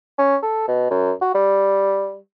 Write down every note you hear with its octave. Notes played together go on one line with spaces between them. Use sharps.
C#4
A4
B2
F#2
F#4
G3